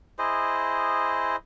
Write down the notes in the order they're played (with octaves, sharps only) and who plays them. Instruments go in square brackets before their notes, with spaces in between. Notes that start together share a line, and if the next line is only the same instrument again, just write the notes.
[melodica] E4 G#4 C5 D#5